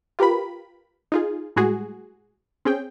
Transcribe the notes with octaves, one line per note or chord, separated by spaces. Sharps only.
F4 G4 A#4 B4 B5
D#4 F4 G#4
A2 G3 G#3 F#4 G#4
C4 C#4 G#4 G5